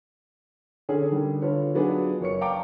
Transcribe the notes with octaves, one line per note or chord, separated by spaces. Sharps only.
D3 C#4 G#4 A4
D3 D#3 G3
D3 F4 B4 C#5
F#3 B3 D4 D#4 F4 G#4
F#1 C#5 C#6 C#7
F5 G5 A5 A#5 D6